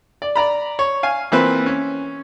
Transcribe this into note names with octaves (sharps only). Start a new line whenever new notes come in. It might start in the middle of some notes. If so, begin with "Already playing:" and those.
D5
D5 A#5 B5
C#5
F5 G#5
E3 A#3 C4 F4 B4 C5
C#4